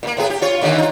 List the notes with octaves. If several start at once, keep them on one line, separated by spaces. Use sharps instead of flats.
A#2 A#3
A2 B3 G#4
G4
F4 C#5
D#2 D3 D#3
D#4 F4